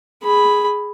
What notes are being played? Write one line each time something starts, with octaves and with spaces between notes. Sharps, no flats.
G#4 B5